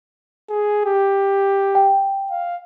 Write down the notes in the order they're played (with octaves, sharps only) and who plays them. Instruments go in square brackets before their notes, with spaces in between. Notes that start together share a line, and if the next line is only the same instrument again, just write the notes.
[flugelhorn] G#4
G4
[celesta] G5
[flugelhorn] F5